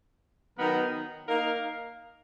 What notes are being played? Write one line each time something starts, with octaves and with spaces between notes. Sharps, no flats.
D#3 F#3 B3 D#4 A#4
A#3 D#4 A#4 F5